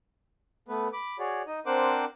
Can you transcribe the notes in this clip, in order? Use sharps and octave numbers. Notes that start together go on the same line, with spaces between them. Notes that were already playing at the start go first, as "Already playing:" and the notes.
A3 B3 B4
B5 D6
F#4 G#4 C#5 D5
D#4 D#5
C4 D4 A#4 C5 F#5 D6